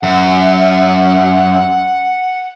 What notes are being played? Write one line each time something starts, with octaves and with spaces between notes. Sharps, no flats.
F#2 F#5